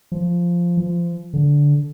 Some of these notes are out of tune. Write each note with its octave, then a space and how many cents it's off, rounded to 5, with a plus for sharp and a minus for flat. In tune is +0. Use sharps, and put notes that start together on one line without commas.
F3 -5
F3 -25
D3 -15